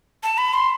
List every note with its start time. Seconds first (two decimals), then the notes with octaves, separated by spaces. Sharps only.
0.23 A5
0.38 B5
0.53 C6